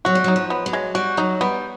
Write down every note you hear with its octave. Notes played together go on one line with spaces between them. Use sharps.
F#3 F#4
G3
F#3 D#4
F3
B3
F#3
G#3
G3 F#4
F#3 D#4
G3 B3